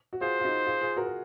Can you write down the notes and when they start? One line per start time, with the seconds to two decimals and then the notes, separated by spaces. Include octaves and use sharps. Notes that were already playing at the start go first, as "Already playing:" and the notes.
0.13 F#4
0.21 F4 G#4 C5
0.40 F4
0.44 D#4 F#4
0.67 F4 G#4
0.81 F4 G#4
0.97 F#4 A#4
1.07 A#4